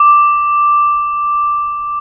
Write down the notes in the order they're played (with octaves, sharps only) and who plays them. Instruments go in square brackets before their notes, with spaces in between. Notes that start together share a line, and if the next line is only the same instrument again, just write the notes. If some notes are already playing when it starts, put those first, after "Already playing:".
Already playing: [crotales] D6